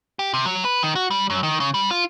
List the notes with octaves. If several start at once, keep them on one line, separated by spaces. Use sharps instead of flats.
G4
C3
F#3
B4
D#3
F#4
G3
F#2
D#3
C#3
G3
F4